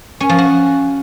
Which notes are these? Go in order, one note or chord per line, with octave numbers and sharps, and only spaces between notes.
C#4
F3
F#4